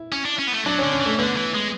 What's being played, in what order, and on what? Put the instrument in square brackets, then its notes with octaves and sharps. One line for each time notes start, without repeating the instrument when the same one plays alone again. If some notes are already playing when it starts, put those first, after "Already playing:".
Already playing: [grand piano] E4
[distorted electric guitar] C#4
D4
C#4
B3
A3
[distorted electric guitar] F#3 [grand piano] D4
[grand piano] C#4
[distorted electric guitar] D3
[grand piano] C#4
[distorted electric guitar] E3
[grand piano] A3
[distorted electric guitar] D3 [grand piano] B3
[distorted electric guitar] E3
G#3